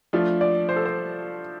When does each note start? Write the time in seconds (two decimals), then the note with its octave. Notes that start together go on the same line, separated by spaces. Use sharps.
0.13 F3 A3 D4 F4
0.41 D5
0.69 C5
0.76 A4
0.85 C5